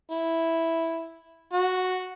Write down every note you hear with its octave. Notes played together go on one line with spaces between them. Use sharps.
E4
F#4